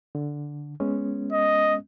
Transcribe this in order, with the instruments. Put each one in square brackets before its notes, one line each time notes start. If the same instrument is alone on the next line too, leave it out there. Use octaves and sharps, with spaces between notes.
[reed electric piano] D3
G#3 B3 C#4
[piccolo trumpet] D#5